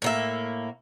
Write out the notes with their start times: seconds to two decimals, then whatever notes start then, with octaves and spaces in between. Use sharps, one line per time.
0.02 A2 A#3 E5